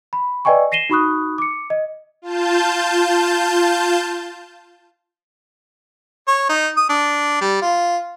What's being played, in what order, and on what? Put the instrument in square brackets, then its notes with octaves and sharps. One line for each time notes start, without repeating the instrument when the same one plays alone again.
[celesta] B5
B4 D5 D#5 G5 G#5 C#6
A#6 C7 D#7 E7 G7
D#4 F#4 B5 C#6 D#6 F#6
D6 C#7
D#5
[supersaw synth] F4 A5 G6
[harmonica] C#5
D#4
D#6
D4
G3
F4